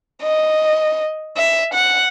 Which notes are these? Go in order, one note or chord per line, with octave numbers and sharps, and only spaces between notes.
D#5
E5
F#5